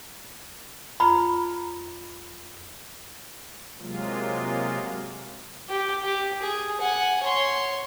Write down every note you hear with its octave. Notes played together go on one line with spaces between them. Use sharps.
F2 F4 A#5 B5
C3 F#3 G#3 A#3 F4
G4
G4
G#4
F#5 G#5
C#5 C6